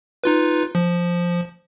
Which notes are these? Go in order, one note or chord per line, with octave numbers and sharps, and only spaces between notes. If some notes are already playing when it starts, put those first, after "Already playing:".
D#4 F4 B4
F3